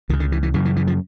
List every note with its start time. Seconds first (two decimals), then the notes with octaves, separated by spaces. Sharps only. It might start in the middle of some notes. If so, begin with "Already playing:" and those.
0.09 C#2 D#3
0.13 C#3
0.20 D3
0.32 E3
0.43 E3
0.54 F#2 C#3 E3
0.65 E3
0.76 E3
0.87 F3